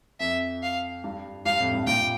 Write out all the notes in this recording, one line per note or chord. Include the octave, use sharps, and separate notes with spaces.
F2 E5
F5
G2
G2 F5
F2 A2
G2
G2 A#2 G5